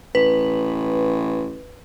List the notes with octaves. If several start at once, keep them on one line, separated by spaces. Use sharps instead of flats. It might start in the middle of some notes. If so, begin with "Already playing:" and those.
A1 B4